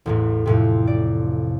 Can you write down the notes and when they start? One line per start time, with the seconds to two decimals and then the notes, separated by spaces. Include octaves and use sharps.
0.06 A1 E2 A2
0.46 F2 A2 C3
0.87 D5